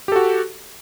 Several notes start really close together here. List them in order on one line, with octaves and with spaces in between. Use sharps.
G4 A4 F#4